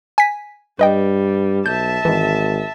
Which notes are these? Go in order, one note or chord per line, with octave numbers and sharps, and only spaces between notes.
G#5 B6
G2 G3 B4 D#5 G5
B1 E5 A5 G6
G#1 E3 G#3